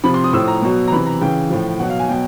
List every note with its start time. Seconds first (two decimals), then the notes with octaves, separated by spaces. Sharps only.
0.04 C3 F3 B5
0.14 C6
0.24 D#6
0.33 A2 F3 E6
0.48 A#5
0.62 B2 F#3
0.87 A#5
0.92 C3 E3 B5
1.06 A#5
1.21 C#3 E3 G5
1.50 A2 F3
1.79 B2 F#3 F#5
1.90 F5
1.99 G#5
2.08 B2 F#3 G5